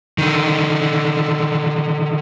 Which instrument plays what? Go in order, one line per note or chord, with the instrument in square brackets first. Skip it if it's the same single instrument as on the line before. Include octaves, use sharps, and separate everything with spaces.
[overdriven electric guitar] D3 D#3